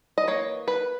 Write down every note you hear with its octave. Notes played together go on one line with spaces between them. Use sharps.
D#5
E3 A#3 C#5
B4